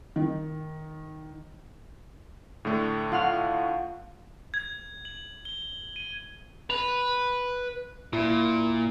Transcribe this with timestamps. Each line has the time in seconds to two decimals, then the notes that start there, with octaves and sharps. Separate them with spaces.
0.16 D#3
2.65 A2 D3 A3
3.12 F4 F#5 F6
4.54 G#6
5.05 F#7
5.45 G7
5.96 D#7
6.70 B4 F7
8.13 A#2 E4